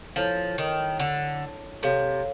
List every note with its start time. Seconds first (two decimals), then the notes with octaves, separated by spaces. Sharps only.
0.16 F3 E4 A4 C#5
0.58 D#3
0.99 D3
1.83 C3 A4 C#5 F5